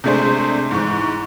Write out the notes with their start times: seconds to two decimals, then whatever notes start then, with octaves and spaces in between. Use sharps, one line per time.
0.04 C3 G#3 A3 D4 G#4 C5
0.71 G#2 E3 C#6